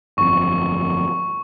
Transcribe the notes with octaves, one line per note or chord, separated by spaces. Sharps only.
G1 F2 C#6